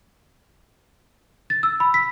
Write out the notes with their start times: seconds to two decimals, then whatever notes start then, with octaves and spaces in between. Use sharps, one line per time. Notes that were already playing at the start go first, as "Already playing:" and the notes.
1.50 A6
1.63 E6
1.80 B5
1.94 B6